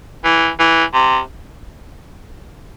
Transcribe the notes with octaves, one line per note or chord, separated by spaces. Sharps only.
E3
E3
C3